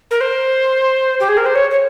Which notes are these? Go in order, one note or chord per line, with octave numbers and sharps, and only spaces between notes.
A#4
C5
G4
G#4
A#4
C5
C#5
C#5